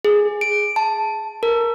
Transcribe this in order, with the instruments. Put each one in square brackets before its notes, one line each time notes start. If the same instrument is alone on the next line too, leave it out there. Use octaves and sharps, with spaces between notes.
[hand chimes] G#4
D7
A5
A#4